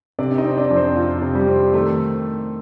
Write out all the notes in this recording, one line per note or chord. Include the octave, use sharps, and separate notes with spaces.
C3 D4 D5
D#4 D#5
C4
D4 D5
F2
C4 C5
F3 F4
C3
G3 G4
C4
D#3 A3 A4